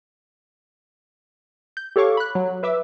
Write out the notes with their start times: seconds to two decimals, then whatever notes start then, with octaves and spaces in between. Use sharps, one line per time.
1.77 G6
1.96 G4 A4 C#5 F5 C#6 D6
2.17 B5 F#6
2.35 F#3
2.63 B4 E5 D6 E6